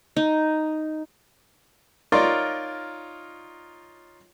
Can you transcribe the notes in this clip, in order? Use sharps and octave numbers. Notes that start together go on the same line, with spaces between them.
D#4
D#4 F4 A#4 C#5 D5 C6